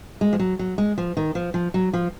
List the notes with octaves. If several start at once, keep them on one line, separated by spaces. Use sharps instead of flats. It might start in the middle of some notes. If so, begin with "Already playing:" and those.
G#3
F3
F#3
F#3
G#3
F3
D#3
F3
F3
F#3
F3